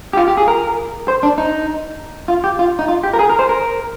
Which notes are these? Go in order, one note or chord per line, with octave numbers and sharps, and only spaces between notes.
G4
F4
G4
G#4
A#4
C5
D4
D#4
F4
G4
F4
D#4
F4
G4
A#4
G#4
A#4
C5
A#4